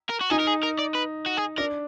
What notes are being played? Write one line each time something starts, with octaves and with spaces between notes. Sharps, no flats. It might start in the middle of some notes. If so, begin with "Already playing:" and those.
A#4
F#4
D#4 G#4
A#4
G#4
A#4
D5
B4
F#4
G#4
D4 A#4